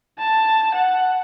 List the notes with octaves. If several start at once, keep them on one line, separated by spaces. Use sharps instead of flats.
A5
F#5